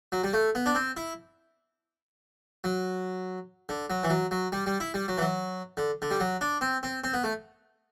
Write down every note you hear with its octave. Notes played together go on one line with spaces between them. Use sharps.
F#3
G3
A3
B3
D4
C4
E4
F#3
D3
F#3
E3
F#3
F#3
G3
G3
E4
G3
F#3
E3
F#3
D3
D3
G3
F#3
D4
C4
C4
C4
B3
A3